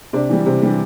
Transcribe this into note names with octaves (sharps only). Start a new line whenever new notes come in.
C3 D4 D5
E3 G3
C3
E3 G3